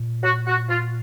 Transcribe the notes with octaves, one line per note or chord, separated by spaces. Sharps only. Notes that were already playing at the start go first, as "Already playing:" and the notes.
Already playing: A#2
F#4
F#4
F4